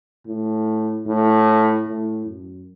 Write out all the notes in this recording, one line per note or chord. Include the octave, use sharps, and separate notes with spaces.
A2
A2
A2
F#2